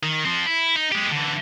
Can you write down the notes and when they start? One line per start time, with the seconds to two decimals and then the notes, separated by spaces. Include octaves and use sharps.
0.03 D#3
0.25 F3 C4
0.46 E4
0.76 D#4
0.92 G#3 G4
1.12 D3 E3